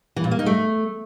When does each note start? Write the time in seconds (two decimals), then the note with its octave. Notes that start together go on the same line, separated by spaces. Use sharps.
0.16 E3
0.24 A#2
0.31 A#3
0.39 D#4
0.46 A3